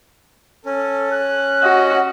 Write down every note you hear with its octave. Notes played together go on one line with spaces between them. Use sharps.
C#4 A4
F#6
F#4 D#5